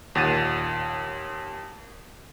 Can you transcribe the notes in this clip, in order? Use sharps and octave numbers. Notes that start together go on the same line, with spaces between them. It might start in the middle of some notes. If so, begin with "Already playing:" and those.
D#2 A#2 F#5 A6 D#7 E7